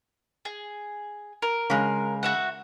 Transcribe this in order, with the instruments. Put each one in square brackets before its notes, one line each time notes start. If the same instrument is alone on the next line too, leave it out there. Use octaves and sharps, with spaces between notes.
[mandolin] G#4
A#4
[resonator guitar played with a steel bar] C#3 G#3
[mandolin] F#4 E5 F#5